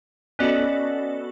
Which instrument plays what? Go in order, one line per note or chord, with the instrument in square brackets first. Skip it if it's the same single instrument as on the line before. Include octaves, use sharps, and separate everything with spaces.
[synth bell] B3 F#4 A4 [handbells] C#4 D5 D#5